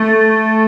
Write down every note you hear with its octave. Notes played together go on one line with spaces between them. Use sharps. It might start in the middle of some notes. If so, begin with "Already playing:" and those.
Already playing: A3